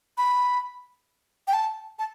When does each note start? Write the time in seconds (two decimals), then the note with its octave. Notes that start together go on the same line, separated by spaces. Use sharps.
0.18 B5
1.48 G5
1.53 A5
1.99 A5